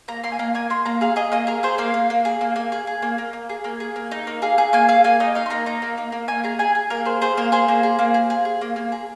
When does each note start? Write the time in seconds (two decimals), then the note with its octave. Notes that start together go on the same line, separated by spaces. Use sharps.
0.08 A#3 A#5
0.24 A#3 C6
0.32 G#5
0.39 A#3 A#5
0.55 A#3 G#5
0.70 A#3 C6
0.85 A#3 A#5
1.01 G#4 F5
1.16 G#4 D#5
1.32 A#3 D#5
1.47 G#4 A#4
1.63 G#4 C5
1.78 A#3 F5
1.94 A#3
2.10 A#3
2.25 G#4
2.41 A#3
2.56 A#3 G#5
2.72 G#4
2.87 G#4
3.02 A#3
3.18 A#3
3.33 A#3
3.49 G#4
3.64 A#3
3.80 G#4
3.96 A#3
4.11 D#4
4.27 A#3
4.42 G#4 F5
4.58 G#4
4.73 A#3 G#5
4.89 G#4 F5
5.04 A#3 G#5
5.20 D#4 D#5
5.35 D#4 F5
5.46 C6
5.50 A#3 A#5
5.66 D#4 A#5
5.82 A#3
5.98 A#3
6.12 A#3
6.28 A#3 G#5
6.44 G#4 A#5
6.59 G#4 G#5
6.75 G#4
6.90 A#3 A#4
7.05 G#4 C5
7.21 G#4 C5
7.37 A#3 A#4
7.52 G#4 C5
7.68 A#3
7.83 G#4
7.99 A#3
8.14 G#4
8.30 G#4
8.45 G#4
8.61 A#3
8.76 A#3
8.92 G#4